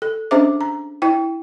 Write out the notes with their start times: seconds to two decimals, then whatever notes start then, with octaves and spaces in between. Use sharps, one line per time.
0.02 A4
0.31 C#4 D4 G#4 C5 E5 D6
0.61 A#5
1.02 E4 G5